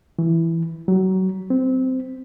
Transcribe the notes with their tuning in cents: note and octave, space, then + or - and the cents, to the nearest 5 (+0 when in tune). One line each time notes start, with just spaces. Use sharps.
E3 +5
F#3 +25
C4 -15